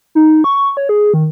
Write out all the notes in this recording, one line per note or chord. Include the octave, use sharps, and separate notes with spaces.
D#4
C#6
C#5
G#4
D#3